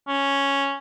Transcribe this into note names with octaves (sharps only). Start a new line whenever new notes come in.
C#4